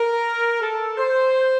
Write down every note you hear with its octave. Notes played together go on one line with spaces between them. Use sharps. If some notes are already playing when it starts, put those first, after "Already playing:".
Already playing: A#4
A4
C5